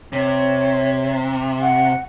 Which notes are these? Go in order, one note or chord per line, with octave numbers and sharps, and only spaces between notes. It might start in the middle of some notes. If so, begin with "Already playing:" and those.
C3 C#5
F#5